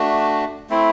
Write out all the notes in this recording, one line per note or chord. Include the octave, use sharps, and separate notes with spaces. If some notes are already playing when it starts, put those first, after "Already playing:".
Already playing: A3 D4 F#4
A3 C4 E4